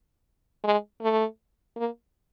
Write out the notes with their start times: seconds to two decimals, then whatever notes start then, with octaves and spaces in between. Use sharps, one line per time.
0.64 G#3
1.02 A3
1.76 A#3